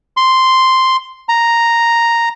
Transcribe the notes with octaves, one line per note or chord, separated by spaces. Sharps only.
C6
A#5